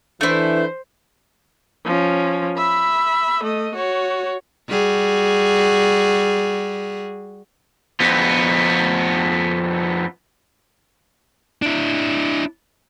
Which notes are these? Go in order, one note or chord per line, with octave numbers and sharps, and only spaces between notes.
E3 A3 D4 E4 B4 C5
F3 C#4
E5 B5
A3 D#5
F#4 C#5
G3 F#4 G#4
F2 B3
D4 E4